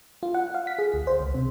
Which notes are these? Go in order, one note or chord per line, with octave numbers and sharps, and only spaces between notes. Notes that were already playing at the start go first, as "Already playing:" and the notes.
F4
F#5
F5
B6
G#4
D2
C5
C#2
C3